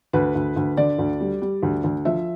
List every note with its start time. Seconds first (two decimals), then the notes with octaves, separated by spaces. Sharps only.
0.13 D2 B4
0.35 D2
0.56 D2
0.77 D3 D5
0.99 D2
1.20 G3
1.42 G3
1.63 D2
1.84 D2
2.05 F3 E5